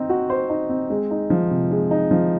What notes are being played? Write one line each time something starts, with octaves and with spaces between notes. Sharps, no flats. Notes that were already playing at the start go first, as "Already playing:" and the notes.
Already playing: C4 D#4
F#4
C5
D#4
C4
G#3
D#4
F3
C3
G#3
D#4
F3